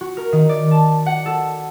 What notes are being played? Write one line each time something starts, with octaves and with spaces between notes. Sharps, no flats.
F#4
A#4
D#3
D5
A5
F#5
A4